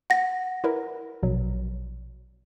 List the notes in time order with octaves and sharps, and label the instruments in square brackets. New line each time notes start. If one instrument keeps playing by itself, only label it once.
[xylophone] F#5 A#6
[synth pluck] E4 A#4 B4
A#1 B2 F#3